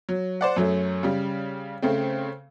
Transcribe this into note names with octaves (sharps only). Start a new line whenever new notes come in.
F#3
C5 D5 F#5
F#2 F#3 A3
C#3 G3
C#3 A3 C4